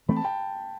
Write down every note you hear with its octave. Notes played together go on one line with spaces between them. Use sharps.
E3 A3 C4 B5
A5
G5